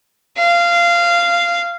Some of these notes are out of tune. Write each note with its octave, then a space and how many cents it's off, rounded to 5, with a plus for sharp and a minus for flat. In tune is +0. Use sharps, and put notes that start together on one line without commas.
F5 -15